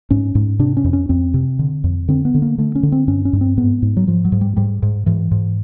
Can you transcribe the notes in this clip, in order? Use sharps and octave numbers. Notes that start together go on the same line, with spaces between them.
G#2 C#4
G#2
C3 D4
C#4
F2
C#4
F2 C4
C3
D3
F2
D3 C4
B3
D3
A#3
D3 A3
C#4
D3
C4
G2 C#4
C#4
G2
C4
G#2 B3
G#2
F#3
G#2 F3
F#3
G#2
G3
G#2 G3
G#2
G#2 E3
G#2